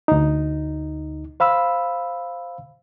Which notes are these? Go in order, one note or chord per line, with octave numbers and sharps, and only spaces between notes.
D2 D#4
C5 F5 B5 E6